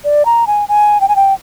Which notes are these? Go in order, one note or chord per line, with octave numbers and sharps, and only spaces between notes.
D5
A#5
G#5
G#5
G5
G#5
G5